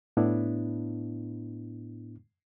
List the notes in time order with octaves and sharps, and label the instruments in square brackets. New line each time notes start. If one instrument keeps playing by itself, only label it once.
[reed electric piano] A2 B3 D4 E4